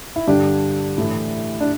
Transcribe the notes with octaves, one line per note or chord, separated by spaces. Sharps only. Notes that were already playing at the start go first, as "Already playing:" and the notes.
E4
G2 D3 D4 G4
A2 E3
D4